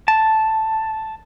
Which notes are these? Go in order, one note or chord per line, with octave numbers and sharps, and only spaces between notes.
A5